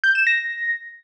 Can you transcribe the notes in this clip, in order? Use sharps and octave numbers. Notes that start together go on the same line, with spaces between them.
G6
E7
A#6